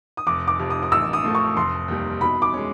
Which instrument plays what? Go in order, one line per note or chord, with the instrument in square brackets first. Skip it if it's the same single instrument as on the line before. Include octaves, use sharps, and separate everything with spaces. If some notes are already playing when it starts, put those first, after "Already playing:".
[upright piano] D#6
[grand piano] F1 [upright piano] D6
[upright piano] D6
[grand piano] F2 C3
[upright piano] D#6
D#6
[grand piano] A1 [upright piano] E6
[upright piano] D#6
[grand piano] A2 F3 A3
[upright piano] C#6
[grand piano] F1 [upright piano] C6
[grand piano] D#2 D#3 G3
[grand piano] B2 [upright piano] B5
[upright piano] D6
[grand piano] G#3 C#4